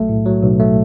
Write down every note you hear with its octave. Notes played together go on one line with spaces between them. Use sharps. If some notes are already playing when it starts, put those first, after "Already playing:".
Already playing: B1 F#3 A3
A2
F#3
B1
A3